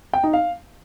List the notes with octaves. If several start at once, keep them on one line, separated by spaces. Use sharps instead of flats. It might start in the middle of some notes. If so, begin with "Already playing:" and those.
G5
D#4
F5